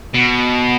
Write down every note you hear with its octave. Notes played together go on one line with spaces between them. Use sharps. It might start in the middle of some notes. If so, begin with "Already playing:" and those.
B2